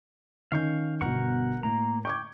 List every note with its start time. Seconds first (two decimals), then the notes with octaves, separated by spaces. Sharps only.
0.52 D#3 C#4 F5 C#6 G6
1.01 G1 B2 A#4 F#5 C#6
1.63 A2 A#3 A#5
2.05 G5 C#6 D6 G#6